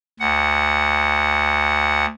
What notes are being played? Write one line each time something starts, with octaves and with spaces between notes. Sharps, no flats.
D2 F#5